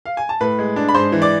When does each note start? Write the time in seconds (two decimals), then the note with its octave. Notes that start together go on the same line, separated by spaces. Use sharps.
0.05 F5
0.17 G#5
0.29 A5
0.41 A2 B4 B5
0.59 G#3
0.76 D4
0.89 B5
0.94 G#2 C5 C6
1.12 E3
1.22 D5 D6